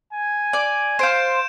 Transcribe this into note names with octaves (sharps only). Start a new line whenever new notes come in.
G#5
D5
F4 C5 G6 D7 E7